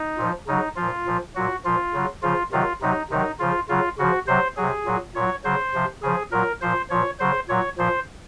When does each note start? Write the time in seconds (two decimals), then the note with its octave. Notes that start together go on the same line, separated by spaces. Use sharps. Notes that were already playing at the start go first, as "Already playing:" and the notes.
Already playing: D#4
0.18 A#2 F3
0.47 C#3 F#3 D#4
0.76 A#2 F3 F4
1.06 A#2 F3
1.35 A#2 F#3 F#4
1.65 A#2 F3 F4
1.93 C#3 F#3
2.22 C#3 F3 F4
2.52 C3 D#3 F#3 F4
2.81 C3 F#3 D#4
3.10 C3 D#3 F#3 D#4
3.39 C#3 F3 F4
3.69 C#3 F#3 F4
3.98 C#3 F3 F#4
4.27 C3 F#3 C5
4.57 C3 F#3 G#4
4.86 A#2 F#3
5.15 A#2 F#3 C#5
5.44 C#3 F#3 C5
5.74 C3 F3
6.03 C#3 F3 G#4
6.32 A#2 F#3 A#4
6.61 A#2 F3 C5
6.90 A#2 F3 C#5
7.20 C#3 F#3 C5
7.49 A#2 F#3 C#5
7.78 A#2 F3 C5